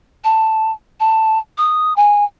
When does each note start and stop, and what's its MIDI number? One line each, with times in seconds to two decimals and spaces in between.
0.24 0.72 81
1.00 1.39 81
1.58 1.95 87
1.96 2.25 80